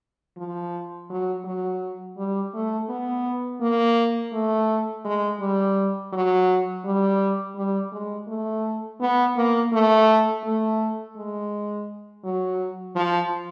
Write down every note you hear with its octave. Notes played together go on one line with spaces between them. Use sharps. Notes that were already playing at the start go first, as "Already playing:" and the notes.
F3
F#3
F#3
G3
A3
B3
A#3
A3
G#3
G3
F#3
G3
G3
G#3
A3
B3
A#3
A3
A3
G#3
F#3
F3